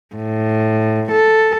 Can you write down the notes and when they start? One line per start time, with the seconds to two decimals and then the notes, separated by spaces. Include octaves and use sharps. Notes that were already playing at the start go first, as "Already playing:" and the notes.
0.15 A2
1.11 A4